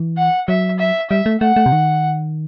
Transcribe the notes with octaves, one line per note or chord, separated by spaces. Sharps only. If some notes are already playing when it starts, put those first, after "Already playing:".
Already playing: E3
F#5
F#3 E5
E5
G3 E5
A3
A3 F#5
A3
C3
D#3